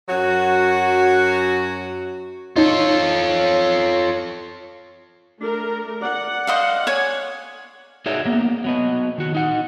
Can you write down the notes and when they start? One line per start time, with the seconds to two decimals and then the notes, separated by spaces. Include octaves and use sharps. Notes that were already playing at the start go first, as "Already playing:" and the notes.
0.09 F#2 F#3 F#4
2.56 D#4 F4 A4 C#5
5.41 A3 D4 A#4
6.03 D5 F#5
6.47 C5 D#5 F5
6.87 C#5 G#5
8.06 D#4 F#4 G#4 C#5 D5 E5
8.25 A#3 B3
8.64 F#3 B3 D#5
9.18 D#3 F#4
9.35 D#4 F#5